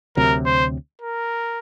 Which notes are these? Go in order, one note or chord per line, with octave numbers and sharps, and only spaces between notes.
D2 C3 F#3 A#4
C5
A#4